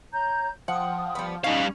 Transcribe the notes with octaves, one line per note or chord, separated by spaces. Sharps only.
C#5 A#5 G6
F3 F#5 G5 D#6
G3 B3
B2 G3 C#4 D#4 F5 F#6